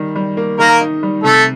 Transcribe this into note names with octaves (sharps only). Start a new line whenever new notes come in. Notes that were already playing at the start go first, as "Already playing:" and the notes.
Already playing: D#3 G3
G3
A#3
D#3 A#3 A#4
D#4
G3
C3 A3 A4